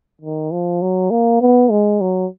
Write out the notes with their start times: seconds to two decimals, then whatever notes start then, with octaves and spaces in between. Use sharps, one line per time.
0.21 D#3
0.52 F3
0.82 F#3
1.11 A#3
1.41 B3
1.71 G#3
2.01 F#3